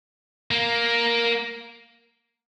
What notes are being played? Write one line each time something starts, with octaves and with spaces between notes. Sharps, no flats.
A#3